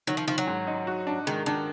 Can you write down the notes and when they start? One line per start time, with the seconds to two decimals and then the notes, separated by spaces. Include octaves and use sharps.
0.07 D#3 F#3
0.17 F3
0.27 D#3 F3
0.38 F#3
0.47 G#2
0.67 D#4
0.87 F#4
1.07 D4
1.27 D#3 G#3
1.46 D#3 D4